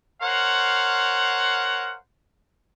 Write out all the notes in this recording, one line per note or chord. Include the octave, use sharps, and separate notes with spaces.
A#4 C5 C#5 F5 F#5